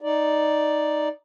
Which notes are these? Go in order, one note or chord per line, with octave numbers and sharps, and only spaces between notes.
D#4 D5